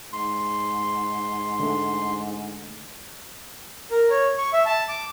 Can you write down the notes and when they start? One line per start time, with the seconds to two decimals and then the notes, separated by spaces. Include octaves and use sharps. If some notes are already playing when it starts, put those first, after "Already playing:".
0.13 G#2 C6
1.60 D3 A3
3.91 A#4
4.10 C#5
4.38 C#6
4.53 E5
4.66 A5
4.89 D6